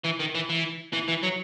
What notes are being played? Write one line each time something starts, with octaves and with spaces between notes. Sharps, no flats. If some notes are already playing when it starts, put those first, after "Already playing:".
E3
D#3
E3
E3
E3
E3
F#3